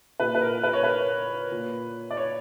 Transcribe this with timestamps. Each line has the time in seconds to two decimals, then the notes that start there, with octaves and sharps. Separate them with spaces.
0.20 A#2 B4
0.35 B4
0.42 A#4
0.63 B4
0.73 C#5
0.83 B4
1.52 A#2
2.11 D5
2.17 C#5